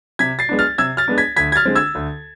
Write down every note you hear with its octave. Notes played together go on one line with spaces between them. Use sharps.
C3 G#6 B6
A6 C7
G#3 B3 D4
F6 A6
C3 E6 G#6
F6 A6
G#3 B3 D4
G#6 B6
D2 G#6 B6
G#6
F6 A6
D3 G#3 C4
E6 G#6
D2